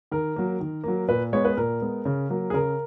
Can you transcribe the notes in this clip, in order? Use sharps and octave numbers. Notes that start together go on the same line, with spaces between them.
D#3 A#4
F#3 A#3
D#3
F#3 A#3
A#2 B4
G#3 B3 C#5
B4
A#2 A#4
G#3 B3
C#3
F#3 A#3
G#4
C#3 A#4